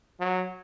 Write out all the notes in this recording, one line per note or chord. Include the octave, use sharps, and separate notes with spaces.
F#3